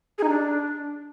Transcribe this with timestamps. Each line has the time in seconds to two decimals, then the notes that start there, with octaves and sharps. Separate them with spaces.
0.18 G#4
0.23 D#4
0.29 D4